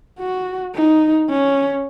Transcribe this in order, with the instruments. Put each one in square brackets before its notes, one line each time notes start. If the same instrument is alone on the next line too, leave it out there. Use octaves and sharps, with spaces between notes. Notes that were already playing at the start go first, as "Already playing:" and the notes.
[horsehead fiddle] F#4
D#4
C#4